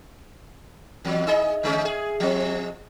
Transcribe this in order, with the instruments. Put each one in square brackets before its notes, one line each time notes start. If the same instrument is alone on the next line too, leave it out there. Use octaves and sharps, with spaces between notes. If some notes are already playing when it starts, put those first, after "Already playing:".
[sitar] E2 F#3
D#4 G#4 D#5
D3 G#3 C#4
G#4
F3 C4